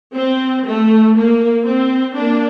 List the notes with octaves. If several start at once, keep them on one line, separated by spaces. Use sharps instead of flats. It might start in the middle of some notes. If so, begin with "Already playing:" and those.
C4
A3
A#3
C4
A#3 D4